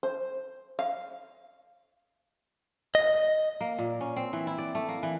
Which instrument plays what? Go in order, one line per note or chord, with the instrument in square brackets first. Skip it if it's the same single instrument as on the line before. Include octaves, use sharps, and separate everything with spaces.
[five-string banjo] C5
F5
[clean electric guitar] D#5
[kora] A#3
A#2
C#4
C4
E3
E4
D5
A3
A#3
E3